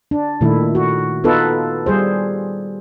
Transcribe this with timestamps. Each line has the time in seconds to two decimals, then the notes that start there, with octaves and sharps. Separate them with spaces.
0.11 D4
0.41 A#2 D#3 A3 E4
0.75 F#4
1.24 B3 D#4 F4 A4 B4
1.86 G3 G#4 C5